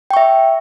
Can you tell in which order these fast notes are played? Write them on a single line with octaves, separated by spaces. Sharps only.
G5 C#6 E5